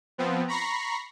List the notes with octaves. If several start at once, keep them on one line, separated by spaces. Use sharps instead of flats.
F3 B3 C4
A#5 B5 C#6 A#6 C7